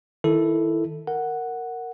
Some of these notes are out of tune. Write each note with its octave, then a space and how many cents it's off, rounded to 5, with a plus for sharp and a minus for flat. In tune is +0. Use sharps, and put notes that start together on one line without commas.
D#3 +20 E4 +0 A4 +0
A#4 -10 F#5 +0